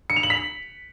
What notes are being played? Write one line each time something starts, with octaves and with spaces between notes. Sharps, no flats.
C#7
F7
F#7
B6